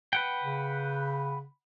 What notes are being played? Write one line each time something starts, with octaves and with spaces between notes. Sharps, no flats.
B4 F#5 G5
C#3